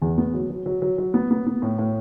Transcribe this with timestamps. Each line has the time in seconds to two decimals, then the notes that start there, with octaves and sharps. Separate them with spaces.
0.02 E2
0.18 B3
0.34 F#3
0.50 F#3
0.66 F#3
0.82 F#3
0.98 F#3
1.14 B3
1.31 B3
1.47 B3
1.62 A2
1.79 A2